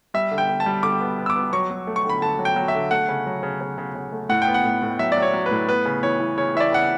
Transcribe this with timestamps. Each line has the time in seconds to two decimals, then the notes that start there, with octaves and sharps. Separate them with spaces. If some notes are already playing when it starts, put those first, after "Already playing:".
0.14 G3 E5
0.31 D3
0.38 G5
0.49 D3
0.60 A5
0.66 G3
0.83 D3 D6
1.01 B3
1.19 B3
1.26 E6
1.30 D6
1.36 B3
1.53 F#3 C#6
1.71 F#3
1.87 A3
1.96 C#6
2.05 D3 B5
2.22 D3 A5
2.39 F#3
2.45 G5
2.56 F#3
2.68 E5
2.75 D3
2.91 A3 F#5
3.09 C#3
3.26 F#3
3.43 C#3
3.61 C#3
3.78 C#3
3.95 C#3
4.12 A3
4.29 A2 F#5
4.42 G5
4.47 B3
4.54 F#5
4.64 A2
4.82 A2
4.99 F#3 E5
5.12 F#3 D5
5.22 C#5
5.34 F#3
5.46 B4
5.51 A2
5.68 B3 B4
5.85 C#3
6.03 E3 C#5
6.20 E3
6.37 C#3 C#5
6.55 E3 E5
6.60 D5
6.72 C#3 F#5